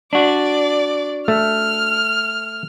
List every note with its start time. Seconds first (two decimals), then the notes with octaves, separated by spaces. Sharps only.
0.13 D4 F#4 D5
1.28 A3 F6